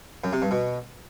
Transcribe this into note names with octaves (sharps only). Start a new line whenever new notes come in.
F#2
C3
G2
B2